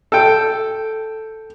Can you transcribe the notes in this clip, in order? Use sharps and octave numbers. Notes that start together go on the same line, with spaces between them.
A4 G5